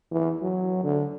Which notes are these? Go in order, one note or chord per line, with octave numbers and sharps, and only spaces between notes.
E3
F#3
D3